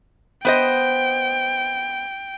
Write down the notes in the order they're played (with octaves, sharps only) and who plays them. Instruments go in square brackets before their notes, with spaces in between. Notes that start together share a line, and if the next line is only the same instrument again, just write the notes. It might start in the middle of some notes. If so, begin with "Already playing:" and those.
[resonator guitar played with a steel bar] B3 C5 D#5 [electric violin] G5